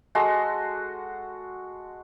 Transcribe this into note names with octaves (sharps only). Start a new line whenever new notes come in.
G#3 F#4 A4 C6